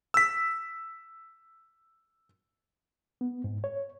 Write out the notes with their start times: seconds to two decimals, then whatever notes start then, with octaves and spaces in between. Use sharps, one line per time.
0.14 E6 B6
3.21 B3
3.44 G#2
3.64 C#5